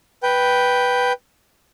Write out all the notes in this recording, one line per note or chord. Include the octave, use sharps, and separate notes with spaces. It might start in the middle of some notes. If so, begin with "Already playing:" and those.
B4 G5